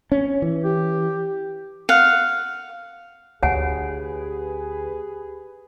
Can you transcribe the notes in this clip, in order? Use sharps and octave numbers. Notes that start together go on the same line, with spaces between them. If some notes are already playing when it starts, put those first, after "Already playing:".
C#4
E3
G4
F5 F#5
D2 G4 G#4 B4 C#5 F#5 G#5